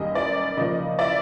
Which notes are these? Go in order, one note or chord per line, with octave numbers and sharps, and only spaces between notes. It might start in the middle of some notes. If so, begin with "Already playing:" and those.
Already playing: F#2 D#3 G3 A#3 D#5
D5
C#3 F3 A#3 D#5
D5 E5